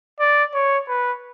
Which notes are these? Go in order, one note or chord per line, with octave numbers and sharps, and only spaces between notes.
D5
C#5
B4